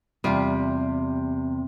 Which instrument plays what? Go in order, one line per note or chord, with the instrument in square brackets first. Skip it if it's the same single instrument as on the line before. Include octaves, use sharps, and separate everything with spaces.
[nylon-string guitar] E2 C3 [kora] G3 F4